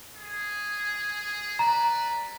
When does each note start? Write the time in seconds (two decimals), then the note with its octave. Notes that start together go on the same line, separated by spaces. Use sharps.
0.16 G#4
1.59 B4 D5 A#5